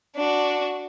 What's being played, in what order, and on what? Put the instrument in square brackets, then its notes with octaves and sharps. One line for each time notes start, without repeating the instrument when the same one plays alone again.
[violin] D4 F#4